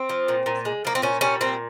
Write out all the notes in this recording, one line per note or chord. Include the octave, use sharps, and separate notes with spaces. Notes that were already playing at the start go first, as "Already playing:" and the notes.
Already playing: C4
F3
A#2
A#2
G#3
F3 A#3
C4
A#2 C#4
G3 C#4
A#2 C4